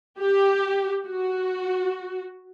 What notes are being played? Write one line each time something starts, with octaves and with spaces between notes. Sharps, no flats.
G4
F#4